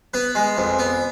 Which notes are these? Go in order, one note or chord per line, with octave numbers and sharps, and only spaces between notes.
B3 B4
G#3
F2
B3